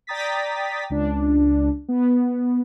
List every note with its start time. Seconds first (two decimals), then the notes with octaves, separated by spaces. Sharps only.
0.07 D5 G5 A#5 D#6 A6 B6
0.90 C#2 D4
1.88 B3